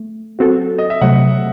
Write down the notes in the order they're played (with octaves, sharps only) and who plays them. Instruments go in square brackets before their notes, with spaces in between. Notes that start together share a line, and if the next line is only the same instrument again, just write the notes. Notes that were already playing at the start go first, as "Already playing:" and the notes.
Already playing: [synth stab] A3
F#3 C4 F#4 A4
[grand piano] D#5
E5
[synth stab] C3 F#3 A3 [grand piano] F#5